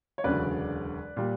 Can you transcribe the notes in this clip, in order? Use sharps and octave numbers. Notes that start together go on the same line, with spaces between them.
C#5
E1 D2 C#3 F#3 B4 D5
A#2 G3